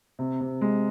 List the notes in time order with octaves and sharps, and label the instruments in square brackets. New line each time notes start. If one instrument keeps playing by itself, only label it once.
[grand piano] C3
C3
G#3